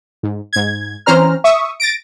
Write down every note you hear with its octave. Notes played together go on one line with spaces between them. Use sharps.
G#2
G#2 G#6
E3 C4 C#4 C5 A#5 F6
E5 C#6 D#6
A6 A#6 D7